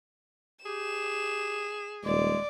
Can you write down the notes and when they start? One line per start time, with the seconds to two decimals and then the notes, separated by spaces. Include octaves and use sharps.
0.65 G4 G#4 E7
2.05 D#1 G#3 D5